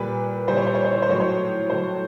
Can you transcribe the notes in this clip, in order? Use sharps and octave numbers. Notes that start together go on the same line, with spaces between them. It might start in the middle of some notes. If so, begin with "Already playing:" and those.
Already playing: A#2 G3 B4
A#2 G3 C5
C#5
C5
C#5
C5
C#5
C5
A2 F#3 C#5
C5
A2 F#3 C5